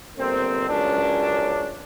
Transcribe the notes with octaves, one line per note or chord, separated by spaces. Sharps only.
G1 A#3 C4
C#2 F#2 C#4 D4